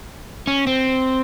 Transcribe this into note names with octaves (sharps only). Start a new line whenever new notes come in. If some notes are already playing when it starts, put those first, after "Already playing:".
C#4
C4